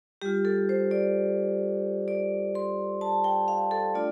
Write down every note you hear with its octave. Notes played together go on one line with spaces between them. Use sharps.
G3 F4 G4
A4
C5
D5
D5
C6
A5
G5
F5
A4
A3 D4 F4 D5